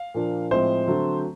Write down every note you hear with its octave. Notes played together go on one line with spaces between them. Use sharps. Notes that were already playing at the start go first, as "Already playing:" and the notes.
Already playing: F5
A#2 F3 A#3 D4
A2 F3 G#3 C4 C5
D3 F#3 A3 C4